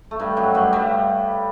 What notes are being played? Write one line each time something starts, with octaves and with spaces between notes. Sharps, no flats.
A3
G2 G3
F#2 F#3
G2 G3
G2 G3